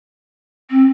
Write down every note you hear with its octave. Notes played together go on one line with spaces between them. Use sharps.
C4